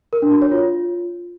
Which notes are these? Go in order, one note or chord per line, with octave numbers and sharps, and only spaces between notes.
A#4
D4
F#4
C#5
F4